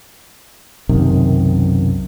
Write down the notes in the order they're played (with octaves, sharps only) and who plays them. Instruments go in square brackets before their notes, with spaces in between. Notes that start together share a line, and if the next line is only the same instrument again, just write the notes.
[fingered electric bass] B1 F#2 C3 D#3